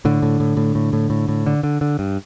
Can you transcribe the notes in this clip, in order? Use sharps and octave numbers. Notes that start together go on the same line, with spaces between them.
A2 D3
A2
A2
A2
A2
A2
A2
A2
D3
D3
D3
G2